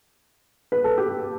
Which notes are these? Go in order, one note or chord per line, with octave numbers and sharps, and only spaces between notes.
B4
A4
G4